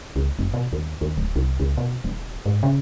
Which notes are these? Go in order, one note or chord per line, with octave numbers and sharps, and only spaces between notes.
C#2
F#1
B2
D#2
D#2
D1
C2
C#2
B2
E1
G#2
C#3